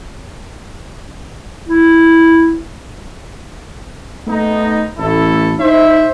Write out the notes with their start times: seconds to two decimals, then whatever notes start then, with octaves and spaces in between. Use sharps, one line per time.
1.69 E4
4.27 A3 B3 D#4
4.98 A1 A3 E4 A4
5.59 D#4 C5 E5